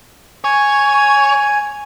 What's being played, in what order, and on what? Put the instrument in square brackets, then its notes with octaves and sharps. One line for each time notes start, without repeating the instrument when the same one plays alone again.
[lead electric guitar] C#5 [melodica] G#5